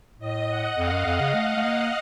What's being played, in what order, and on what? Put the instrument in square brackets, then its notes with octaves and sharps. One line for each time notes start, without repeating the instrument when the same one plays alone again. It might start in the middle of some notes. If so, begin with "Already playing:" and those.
[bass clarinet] A2 [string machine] D#5
[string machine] F#5
[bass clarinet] F2 [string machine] F5
[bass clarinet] F#2
[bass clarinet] F2 [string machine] D#5
[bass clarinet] C#3
A3
A3
A#3